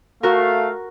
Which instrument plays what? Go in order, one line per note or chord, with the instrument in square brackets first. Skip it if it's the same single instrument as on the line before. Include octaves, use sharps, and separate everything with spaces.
[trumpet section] A3 F5 [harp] F#4 A#4